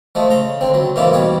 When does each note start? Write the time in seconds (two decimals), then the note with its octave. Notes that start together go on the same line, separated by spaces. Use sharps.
0.15 F3 G#3 A3
0.30 C#3 A#5 C6
0.61 D3 C4
0.74 C#2 F#3
0.96 G#2 C#3 E3 A#3 E4 F4
1.13 E2 B2 G3 C#5 D6